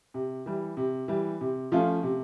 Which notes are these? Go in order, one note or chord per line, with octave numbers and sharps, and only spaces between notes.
C3
E3 G3
C3
E3 G3
C3
F3 A3 C#4 F4
C3